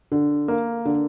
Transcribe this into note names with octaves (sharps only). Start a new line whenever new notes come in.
D3
A#3
D3